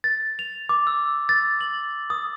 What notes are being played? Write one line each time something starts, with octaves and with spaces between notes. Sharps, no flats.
A6
F7
D6
E6
A6
F#7
D#6